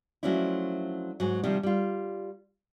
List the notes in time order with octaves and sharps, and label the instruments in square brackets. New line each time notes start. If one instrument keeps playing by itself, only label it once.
[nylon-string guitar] F3 F#3 A3 C#4 D4 E4
G#2 F#3
C3 D#3 F3 G3
G3 F4